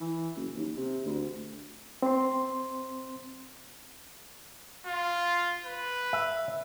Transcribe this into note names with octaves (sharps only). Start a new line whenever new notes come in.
E3
F#1
D#2
C3
D2
C4 C6
F4
B4
E5